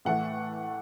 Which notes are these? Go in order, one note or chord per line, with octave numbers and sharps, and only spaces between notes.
A2 E3 A3 F#5